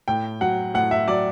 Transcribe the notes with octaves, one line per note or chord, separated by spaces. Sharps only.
A2 G5
F#3 F#5
A2 F#5
E5
F#3 D5